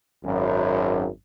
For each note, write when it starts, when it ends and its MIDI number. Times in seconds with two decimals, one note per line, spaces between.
0.25 1.07 32
0.25 1.07 42